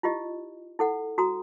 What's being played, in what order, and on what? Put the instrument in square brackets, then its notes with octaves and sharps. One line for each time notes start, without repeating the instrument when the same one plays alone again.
[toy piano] E4 F4 G4 D#5
E4 A4 F#5
F#4 A#5 D#6